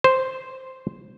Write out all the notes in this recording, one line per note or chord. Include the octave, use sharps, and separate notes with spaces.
C5